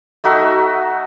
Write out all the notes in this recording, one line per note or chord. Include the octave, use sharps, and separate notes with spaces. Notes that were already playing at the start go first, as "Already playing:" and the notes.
A3 D#4 F#4 E5